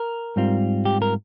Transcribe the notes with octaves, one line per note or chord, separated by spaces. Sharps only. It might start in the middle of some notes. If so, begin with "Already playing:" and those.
Already playing: A#4
G#2 G3 C4 F4
G4
A#4